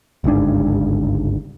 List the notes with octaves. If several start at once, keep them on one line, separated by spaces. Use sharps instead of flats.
G1 C#2 G#2 D4